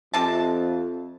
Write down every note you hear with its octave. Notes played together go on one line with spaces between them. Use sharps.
F2 C3 A5